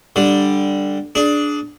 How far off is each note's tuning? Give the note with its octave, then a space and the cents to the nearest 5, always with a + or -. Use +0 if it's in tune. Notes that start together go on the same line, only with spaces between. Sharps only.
D3 +0 G3 +0
D4 +0 G#4 +20